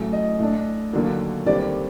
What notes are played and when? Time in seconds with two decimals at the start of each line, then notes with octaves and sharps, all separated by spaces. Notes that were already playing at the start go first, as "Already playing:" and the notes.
Already playing: A1 A2 F#3
0.13 D#5
0.39 A2 A3 D4
0.93 D#2 D3 F#3 A#3
1.46 D#2 D3 G3 C4 D5